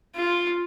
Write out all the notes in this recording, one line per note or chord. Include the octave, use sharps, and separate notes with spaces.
F4